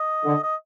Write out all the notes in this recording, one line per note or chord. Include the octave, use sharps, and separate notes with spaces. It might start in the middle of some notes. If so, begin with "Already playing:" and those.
Already playing: D#5
D3
D#5